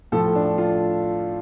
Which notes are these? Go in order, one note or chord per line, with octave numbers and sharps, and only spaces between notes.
A2 F3 A4
D4
F4